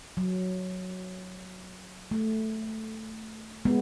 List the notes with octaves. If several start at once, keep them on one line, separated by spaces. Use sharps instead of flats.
F#3
A3
G#3 B3